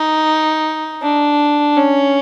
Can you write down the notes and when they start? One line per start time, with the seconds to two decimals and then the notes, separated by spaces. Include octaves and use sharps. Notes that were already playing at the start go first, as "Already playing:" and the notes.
Already playing: D#4
1.02 D4
1.77 C#4